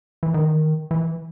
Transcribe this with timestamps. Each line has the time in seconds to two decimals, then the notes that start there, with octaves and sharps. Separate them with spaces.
0.23 E3
0.34 D#3
0.91 E3